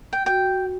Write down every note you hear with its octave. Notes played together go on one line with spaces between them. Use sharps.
G5
F#4 G5